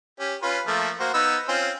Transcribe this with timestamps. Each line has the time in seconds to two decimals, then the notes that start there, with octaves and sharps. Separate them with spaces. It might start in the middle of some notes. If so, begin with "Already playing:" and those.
0.20 C#4 G4
0.42 C#4 F4 B4
0.67 F3 A3 A#3
1.00 A#3 F#4 C5
1.14 B3 D#4 E6
1.49 C4 C#4 F4